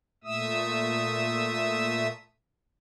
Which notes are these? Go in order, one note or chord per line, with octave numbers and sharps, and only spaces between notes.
A#2 A3 E5 D#6 E6